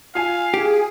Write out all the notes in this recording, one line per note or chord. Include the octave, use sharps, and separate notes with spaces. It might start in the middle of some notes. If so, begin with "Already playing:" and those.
F4 F5 G#5
G4 G#4